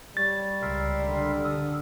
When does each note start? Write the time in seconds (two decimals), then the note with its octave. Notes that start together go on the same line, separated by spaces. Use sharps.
0.17 G3 C#5 A6
0.62 C#2 A#4 E5 C6
1.04 D3
1.44 A4 D#6